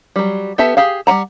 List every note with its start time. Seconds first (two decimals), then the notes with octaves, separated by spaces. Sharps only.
0.16 F#3 G3
0.58 B3 G4 A4 E5 A5
0.77 G4 G#4 F5
1.07 G3 E5 F#5 A#5